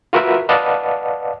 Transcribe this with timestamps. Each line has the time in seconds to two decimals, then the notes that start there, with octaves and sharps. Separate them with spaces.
0.13 F4 F#4 A#4 B4 E5
0.49 B4 D5 D#5 F5 F#5 A5